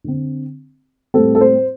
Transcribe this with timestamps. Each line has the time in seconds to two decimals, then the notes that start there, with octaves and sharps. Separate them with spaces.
0.04 D3 C4
1.14 A2 G3 C4 A4
1.35 A4
1.41 C5